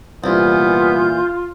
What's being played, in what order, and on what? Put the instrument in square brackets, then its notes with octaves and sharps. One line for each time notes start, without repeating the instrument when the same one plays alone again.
[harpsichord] C2 [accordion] A#2 E3 G6 [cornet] B3 [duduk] F4